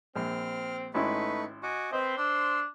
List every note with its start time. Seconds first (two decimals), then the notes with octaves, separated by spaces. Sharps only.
0.16 A#1 C4 F6
0.94 G#1 A3 C#4 D#4 E4 B4 C#6
1.63 F#4 D#5 G#5 D6
1.92 C4 B4 C5 D#5 B5
2.17 D4 C6 E6